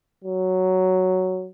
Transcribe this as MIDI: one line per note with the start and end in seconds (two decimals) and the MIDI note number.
0.24 1.49 54